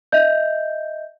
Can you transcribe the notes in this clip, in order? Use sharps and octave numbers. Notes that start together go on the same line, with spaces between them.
D#5 E5 G6